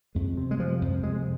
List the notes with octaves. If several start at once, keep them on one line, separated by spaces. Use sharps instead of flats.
F2 G#3
C3
G#3
C3 F3
F2
C3 G#3